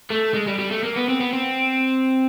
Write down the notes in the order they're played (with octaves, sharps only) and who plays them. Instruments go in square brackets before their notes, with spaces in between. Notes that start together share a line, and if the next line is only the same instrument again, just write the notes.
[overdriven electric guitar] A3
G#3
G3
G3
A3
A#3
B3
C4
B3
C4